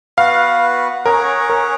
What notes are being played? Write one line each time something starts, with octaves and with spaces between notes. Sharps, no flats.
B3 F#4 B4 F5 F#5
C#4 G#4 A#4 C#5 F#5
A#4